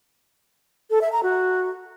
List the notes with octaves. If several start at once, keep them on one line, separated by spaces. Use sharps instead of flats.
A4
E5
A#5
F#4